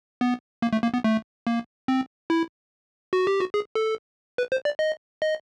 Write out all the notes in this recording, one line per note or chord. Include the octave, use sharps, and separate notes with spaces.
B3
A#3
A3
A#3
B3
A3
A#3
C4
E4
F#4
G4
F#4
G#4
A4
B4
C5
D5
D#5
D#5